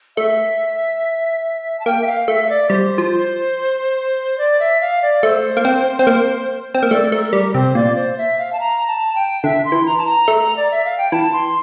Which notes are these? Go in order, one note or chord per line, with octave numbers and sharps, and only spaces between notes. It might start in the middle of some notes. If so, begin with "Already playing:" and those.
A3 E5
A5
A#3 G5
E5
F5
A3 E5
E5
D5
G3 C5
F3
D5
E5
F5
D5
A3 C5
A#3
C4
C4
A#3
C4
A#3
A3 D5
A3 A#4
G3 A#4
C3 C5
A#2 D5
C5
E5
F5
A5
A#5
A5
G5
D3 E5
C6
E3
A#5
A5
A#5
A3
D5
E5
F5
G5
E3 A5
C6